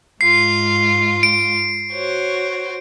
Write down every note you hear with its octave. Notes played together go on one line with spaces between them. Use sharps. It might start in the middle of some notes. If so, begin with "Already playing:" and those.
G#2 F4 C7
D7
F#4 C5 C#5